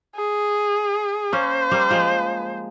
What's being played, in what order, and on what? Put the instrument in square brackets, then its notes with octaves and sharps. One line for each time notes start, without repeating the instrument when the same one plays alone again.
[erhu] G#4
[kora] A#3 C#4 [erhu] C5
[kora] G3 A#3
F3 G#3